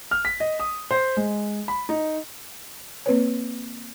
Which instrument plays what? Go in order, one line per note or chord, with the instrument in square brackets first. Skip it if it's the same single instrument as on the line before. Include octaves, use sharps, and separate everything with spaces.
[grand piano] F6
B6
D#5
D#6
C5
G#3
B5
D#4
[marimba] A#3 C4 B4 C#5